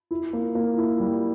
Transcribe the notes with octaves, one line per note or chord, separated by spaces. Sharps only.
E4
A#3
A#3
E4
G3